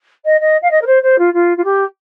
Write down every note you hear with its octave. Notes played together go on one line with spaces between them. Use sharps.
D#5
D#5
F5
D#5
A#4
C5
C5
F4
F4
F4
G4